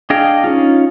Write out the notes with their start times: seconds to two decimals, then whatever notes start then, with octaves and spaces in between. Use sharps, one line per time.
0.10 D4 G#4 D#5 F5 G5
0.44 C#4 D#4 F4